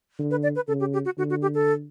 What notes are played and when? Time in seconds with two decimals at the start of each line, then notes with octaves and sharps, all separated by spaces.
0.19 D3
0.31 B4
0.43 D5
0.56 B4
0.68 C#3 A4
0.80 G4
0.93 G4
1.05 F#4
1.18 D3 F#4
1.30 F#4
1.42 G4
1.54 A4